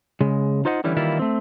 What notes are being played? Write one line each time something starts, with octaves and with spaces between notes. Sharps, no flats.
C#3 G#3
D#4 F4 C5 D#5 F#5
D3 E3 G3 C#4 E4
D#3 E3 G3 A#3 E4 F4
A3 C4